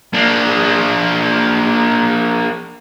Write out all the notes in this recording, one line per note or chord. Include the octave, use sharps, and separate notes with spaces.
A#3 D4